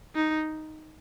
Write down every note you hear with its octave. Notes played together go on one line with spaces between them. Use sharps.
D#4